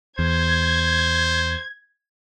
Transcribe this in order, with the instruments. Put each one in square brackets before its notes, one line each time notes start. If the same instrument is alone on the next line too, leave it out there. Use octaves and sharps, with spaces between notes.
[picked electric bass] E2 [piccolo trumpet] C5 [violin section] G#6